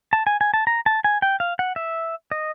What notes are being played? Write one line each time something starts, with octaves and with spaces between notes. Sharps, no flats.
A5
G#5
G#5
A5
A#5
A5
G#5
G5
F5
F#5
E5
D#5